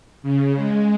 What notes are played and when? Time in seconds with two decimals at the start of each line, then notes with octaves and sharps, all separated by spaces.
0.23 C#3
0.56 G#3